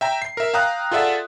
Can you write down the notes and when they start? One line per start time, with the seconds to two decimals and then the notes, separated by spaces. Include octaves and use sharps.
0.01 E5 G5 A#5
0.22 C7
0.37 A#4 E5
0.54 F5 G5 A#5 D#6 F#6
0.91 F4 G#4 A4 D5 E5 F#5